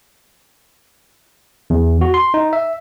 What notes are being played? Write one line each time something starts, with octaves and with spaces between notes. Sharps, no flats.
E2
F#4
C6
D#4
E5